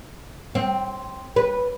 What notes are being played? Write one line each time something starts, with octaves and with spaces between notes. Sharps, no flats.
C4
B4